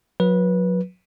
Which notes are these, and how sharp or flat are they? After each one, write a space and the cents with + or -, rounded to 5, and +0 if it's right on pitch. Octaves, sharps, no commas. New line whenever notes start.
F#3 -30 B4 -20